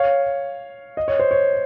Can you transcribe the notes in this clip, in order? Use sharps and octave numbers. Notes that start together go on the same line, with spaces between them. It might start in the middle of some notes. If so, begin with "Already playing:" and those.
Already playing: C#5 F5
D#5
C#5
C5
C#5